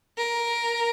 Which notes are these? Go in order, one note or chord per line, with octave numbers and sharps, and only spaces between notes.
A#4